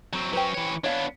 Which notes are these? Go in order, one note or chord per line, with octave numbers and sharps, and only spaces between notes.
F#3 C4
F#3 C#4 B4 C5 G5
E3 C#5
B3 D4 C#5 F5